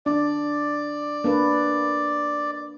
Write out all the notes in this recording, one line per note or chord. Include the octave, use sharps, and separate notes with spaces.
D4 D5
A#3 D4 B4